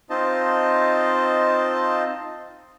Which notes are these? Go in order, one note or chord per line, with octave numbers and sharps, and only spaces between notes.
C4 D#4 F4 C5 D#5 A5